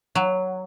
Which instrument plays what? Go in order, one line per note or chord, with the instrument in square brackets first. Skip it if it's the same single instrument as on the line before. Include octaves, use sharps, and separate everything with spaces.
[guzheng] F#3